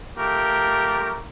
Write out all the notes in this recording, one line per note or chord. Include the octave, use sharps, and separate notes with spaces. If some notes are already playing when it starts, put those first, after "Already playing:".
A3 F4 G4 A#4